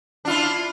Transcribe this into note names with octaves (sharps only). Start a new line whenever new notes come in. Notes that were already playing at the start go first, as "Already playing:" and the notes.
D4 E4 F4